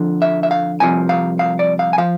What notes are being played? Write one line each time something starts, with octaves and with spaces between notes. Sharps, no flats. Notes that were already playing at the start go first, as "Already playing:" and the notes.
Already playing: F2 D3 F3
E5
E5
F5
C2 C3 F3 G#5
F5
F5
D5
F5
G#5
F3 F5